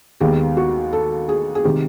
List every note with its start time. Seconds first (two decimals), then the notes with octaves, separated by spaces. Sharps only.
0.20 D#2 D#3 G#3 B3 G4
0.57 F#4
0.93 A4
1.29 G#4
1.55 G#4
1.64 C3 D#3 G#3 G4